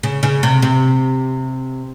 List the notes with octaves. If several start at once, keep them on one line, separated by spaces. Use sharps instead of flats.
C#3
C#3
C3
C3